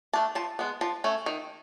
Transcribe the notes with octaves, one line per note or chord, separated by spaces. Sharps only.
A3 D4 A5
F3 A5
G#3 B3
F3 A5
A3 C#4
D#3